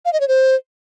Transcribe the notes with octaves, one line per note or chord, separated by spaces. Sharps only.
F5
D#5
C#5
C5